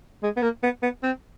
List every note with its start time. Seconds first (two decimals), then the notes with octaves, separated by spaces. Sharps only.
0.23 G#3
0.37 B3
0.42 A#3
0.63 B3
0.83 B3
1.03 C4